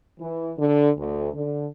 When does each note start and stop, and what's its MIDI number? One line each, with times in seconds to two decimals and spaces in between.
0.19 0.52 52
0.58 0.89 50
0.97 1.29 38
1.34 1.66 50